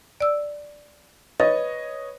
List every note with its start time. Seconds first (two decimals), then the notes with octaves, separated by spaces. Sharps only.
0.20 D5 E6
1.40 B4 C#5 D#5 A6